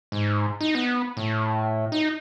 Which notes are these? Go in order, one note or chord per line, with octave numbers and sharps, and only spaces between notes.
G#2
D#4
B3
A2
D#4